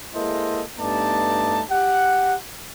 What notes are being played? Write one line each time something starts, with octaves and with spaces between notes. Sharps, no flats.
G#3 A#3 E4 A4 C5 D#5
G2 A3 B3 D#4 D5 A5
G4 F#5